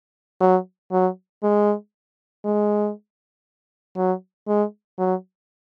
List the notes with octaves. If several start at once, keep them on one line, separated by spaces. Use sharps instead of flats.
F#3
F#3
G#3
G#3
F#3
G#3
F#3